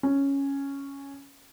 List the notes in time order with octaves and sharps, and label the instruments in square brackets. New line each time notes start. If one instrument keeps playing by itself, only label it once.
[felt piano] C#4